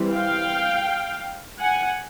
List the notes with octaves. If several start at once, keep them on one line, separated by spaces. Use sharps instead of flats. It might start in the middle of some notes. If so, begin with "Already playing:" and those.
Already playing: E3 G3 C4
F5 G5
F#5 G#5